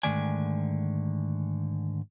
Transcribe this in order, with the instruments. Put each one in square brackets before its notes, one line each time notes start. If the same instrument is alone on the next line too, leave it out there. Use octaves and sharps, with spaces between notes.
[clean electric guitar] G#2 D3 D#3 A3 D5 G#5